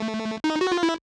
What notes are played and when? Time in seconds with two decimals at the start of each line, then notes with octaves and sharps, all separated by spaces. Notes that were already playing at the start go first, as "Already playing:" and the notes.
Already playing: A3
0.44 D#4
0.61 F#4
0.72 F4
0.83 E4